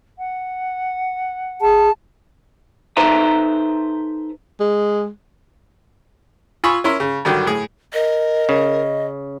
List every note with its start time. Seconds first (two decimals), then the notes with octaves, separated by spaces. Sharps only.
0.18 F#5
1.61 G#4 A5
2.97 D#4 A4 B4 C5 E5 A#5
4.60 G#3
6.64 F4 G#5 B5 C#6 D#6 E6
6.84 C#4 E4 A#4 C6
7.00 C#3
7.25 G2 D3 D#3 F#3
7.46 A2 G#4
7.93 A#4 D#5
8.49 C#3